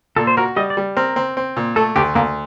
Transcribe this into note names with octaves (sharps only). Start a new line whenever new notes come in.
A#2 A4
C5
F#4 A#4
G3 D#5
D5
G3
C4 A#4
C4
C4
A#2
A3 A4
D2 G4
D2 A#3